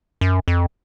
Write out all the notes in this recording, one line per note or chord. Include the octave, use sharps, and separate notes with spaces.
F#2
F2